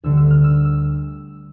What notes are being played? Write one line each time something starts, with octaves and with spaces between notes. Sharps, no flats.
D2 D3 G3 E6
E6
F6
E6
E6